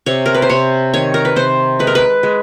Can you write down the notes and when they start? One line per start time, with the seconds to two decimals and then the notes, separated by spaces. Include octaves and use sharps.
0.06 C3 C#5
0.26 A#4
0.34 B4
0.42 C5
0.49 C3 C#5
0.94 D#3 C#5
1.14 A#4
1.25 B4
1.36 C3 C5
1.79 G#3 B4
1.87 A#4
1.95 B4
2.23 G#3